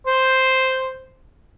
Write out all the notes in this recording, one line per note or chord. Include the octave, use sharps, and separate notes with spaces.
C5